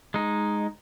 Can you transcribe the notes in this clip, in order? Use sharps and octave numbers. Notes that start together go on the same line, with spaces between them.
G#3 D#4